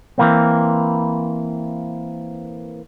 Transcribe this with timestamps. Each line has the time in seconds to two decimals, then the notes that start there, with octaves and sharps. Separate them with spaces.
0.18 E3 A#3 C4